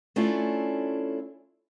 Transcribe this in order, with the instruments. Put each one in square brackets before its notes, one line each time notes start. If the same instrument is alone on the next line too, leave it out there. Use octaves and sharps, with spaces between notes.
[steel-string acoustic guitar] A3 C#4 D4 E4 F4